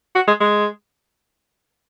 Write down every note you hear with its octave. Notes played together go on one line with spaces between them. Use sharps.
F#4
G#3
G#3